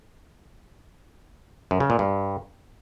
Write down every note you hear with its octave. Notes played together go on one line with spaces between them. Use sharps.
F#2
C#3
A#2
G2